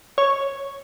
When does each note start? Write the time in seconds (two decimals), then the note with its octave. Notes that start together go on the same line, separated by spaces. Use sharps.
0.18 C#5